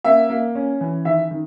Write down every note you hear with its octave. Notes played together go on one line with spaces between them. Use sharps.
A#3 E5
A#3
C#4
E3
D#3 E5
D#3